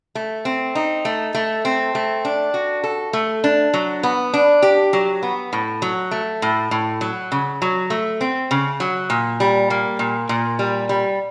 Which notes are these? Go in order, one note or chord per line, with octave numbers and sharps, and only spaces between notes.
A3
C4
D#4
A3
A3
C4
A3
D4
F#4
A4
A3
D4
F#3
B3
D4
G4
F#3
B3
A2
F#3
A3
A2
A2
F#3
C#3
F#3
A3
C4
C#3
F#3
A#2
G3
A#3
A#2
A#2
G3
G3